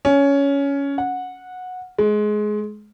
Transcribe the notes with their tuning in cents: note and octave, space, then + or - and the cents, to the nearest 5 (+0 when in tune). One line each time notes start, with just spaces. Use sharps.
C#4 +15
F#5 -15
G#3 +20